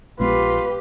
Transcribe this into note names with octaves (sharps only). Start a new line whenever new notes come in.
A#1 G#3 B3 F4 G4 B4